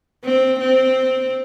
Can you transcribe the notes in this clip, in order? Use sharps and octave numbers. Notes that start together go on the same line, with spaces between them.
C4
C4